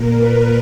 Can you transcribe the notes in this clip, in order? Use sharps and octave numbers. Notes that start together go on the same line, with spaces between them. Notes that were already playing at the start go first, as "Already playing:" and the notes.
Already playing: A#2 A#4
B4